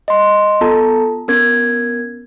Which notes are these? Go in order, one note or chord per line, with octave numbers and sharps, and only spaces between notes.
D#5 C6
B3 F4 A4 A5 A#5
B3 C#4 A#4 G#6